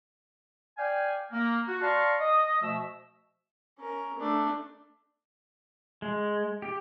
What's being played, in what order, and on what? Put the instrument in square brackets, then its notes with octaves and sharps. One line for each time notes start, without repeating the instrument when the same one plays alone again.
[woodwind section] D5 F5 G5 G#5
A#3
F#4
D5 F5 A5 A#5 C6 C#6
D#5
B2 F3 A3 E5 E6
[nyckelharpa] C#4 A#4
A3 D4
[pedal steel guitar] G#3
G4